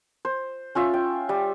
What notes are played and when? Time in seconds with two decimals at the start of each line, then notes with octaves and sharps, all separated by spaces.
0.25 C5
0.75 C#4 F4 E5
0.94 G5
1.29 G3